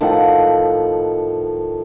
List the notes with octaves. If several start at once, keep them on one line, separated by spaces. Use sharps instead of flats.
A2 D#3 F3 F#5